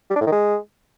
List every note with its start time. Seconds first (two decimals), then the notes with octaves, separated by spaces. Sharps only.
0.10 G3
0.16 D4
0.21 A2
0.27 D#3
0.32 G#3